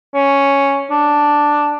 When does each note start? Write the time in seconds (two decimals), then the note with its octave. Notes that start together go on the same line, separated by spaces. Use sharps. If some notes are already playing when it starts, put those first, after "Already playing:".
0.14 C#4
0.91 D4